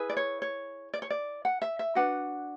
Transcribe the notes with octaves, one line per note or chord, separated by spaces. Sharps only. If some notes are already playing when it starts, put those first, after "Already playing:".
Already playing: E4 G#4 B4
D5
C#5
C#5
D5
C#5
D5
F#5
E5
E5
D4 F#4 B4 F#5